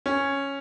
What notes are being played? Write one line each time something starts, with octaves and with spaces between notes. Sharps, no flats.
C#4